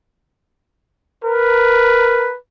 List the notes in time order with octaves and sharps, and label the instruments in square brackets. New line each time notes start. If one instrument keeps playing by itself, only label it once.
[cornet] A#4 [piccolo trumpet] B4